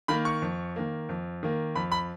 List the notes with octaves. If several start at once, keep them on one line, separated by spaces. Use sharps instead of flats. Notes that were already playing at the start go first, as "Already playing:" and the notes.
D#3 A#3 B5
C#6
F2
D#3 A#3
F2
D#3 A#3
F2 B5
B5